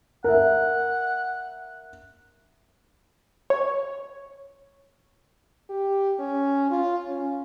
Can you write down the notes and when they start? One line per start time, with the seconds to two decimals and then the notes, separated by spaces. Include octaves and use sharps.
0.24 A#4 E5 F#5
3.50 C#5
5.70 G4
6.19 C#4
6.71 F4
7.08 C#4